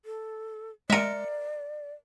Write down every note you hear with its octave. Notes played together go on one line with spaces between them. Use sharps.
A4
G#3 A#4 D5 E5 C#7